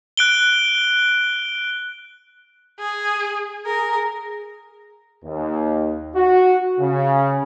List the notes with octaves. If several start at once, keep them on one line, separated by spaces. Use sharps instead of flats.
F#6 D7 G7
G#4
G#4 A#4
D#2
F#4
C#3